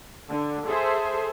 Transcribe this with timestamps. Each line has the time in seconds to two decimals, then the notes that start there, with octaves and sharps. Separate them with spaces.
0.30 D3
0.66 G#4 A4 C5 E5